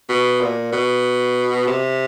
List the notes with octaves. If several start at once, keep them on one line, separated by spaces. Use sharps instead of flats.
B2
A#2
B2
C3